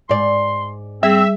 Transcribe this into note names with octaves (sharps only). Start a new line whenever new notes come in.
G#2 D5 C6
G3 C4 G#4 E5